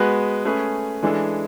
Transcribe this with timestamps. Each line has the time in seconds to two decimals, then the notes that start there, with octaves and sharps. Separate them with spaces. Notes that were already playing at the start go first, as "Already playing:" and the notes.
Already playing: G#3 B3 F#4 B4
0.45 A3 C#4 G#4 B4
1.03 E3 G#3 D4 A4